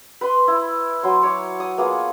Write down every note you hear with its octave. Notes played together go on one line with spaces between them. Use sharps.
B4 C6
E4
F#3 C6
C#5 D6
D#6
A#3 B3 F4 G#4